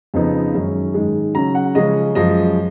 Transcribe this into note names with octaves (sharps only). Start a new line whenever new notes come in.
F2 C#3 F3 B3 D#4
F#2 D#3 G#3 C#4
G#2 D#3 G#3
C#3 F#3 C#4 A#5
F#5
C#3 F3 G#3 C#4 D#5
F#2 F3 G#3 D#5